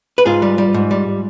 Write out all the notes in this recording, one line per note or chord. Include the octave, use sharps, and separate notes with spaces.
B4
G#2 F4 G#4
G3
G3
G#2
G3